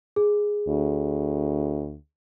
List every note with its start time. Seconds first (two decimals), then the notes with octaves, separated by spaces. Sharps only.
0.16 G#4
0.68 D2